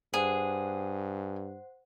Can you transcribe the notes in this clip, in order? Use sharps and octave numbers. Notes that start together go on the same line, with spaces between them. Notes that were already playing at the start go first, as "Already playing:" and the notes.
G2 G#4 C5 F#5